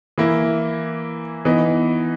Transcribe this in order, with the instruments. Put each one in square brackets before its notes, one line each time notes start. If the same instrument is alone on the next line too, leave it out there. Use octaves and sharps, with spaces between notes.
[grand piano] E3 A#3 E4
E3 B3 D#4